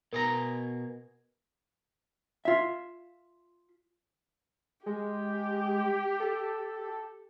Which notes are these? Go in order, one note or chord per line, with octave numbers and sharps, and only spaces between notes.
B2 G#4 A#4 A#5
F4 E5
G#3 G4
A4